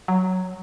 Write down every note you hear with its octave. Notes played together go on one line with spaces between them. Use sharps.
F#3